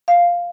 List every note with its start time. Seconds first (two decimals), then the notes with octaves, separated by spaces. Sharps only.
0.08 F5